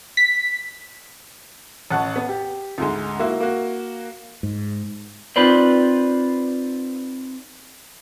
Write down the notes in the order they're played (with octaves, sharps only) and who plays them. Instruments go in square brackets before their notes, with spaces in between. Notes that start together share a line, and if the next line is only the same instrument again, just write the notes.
[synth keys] B6
[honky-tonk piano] A1 F#5 A5 C#6
B3
G4
D2 G#2 G#3
A#3 E4 F#4
A#3 F#4
[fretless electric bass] G#2
[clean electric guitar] C4 D#4 F4 B4 C5 D5